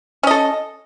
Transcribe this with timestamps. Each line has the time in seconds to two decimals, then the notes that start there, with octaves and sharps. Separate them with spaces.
0.23 C#4
0.27 D#5
0.31 A4